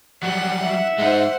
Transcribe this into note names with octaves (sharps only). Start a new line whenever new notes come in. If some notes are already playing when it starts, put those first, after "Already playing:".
F#3 G3 F#5
E5
G#3 D#4 C5 F#5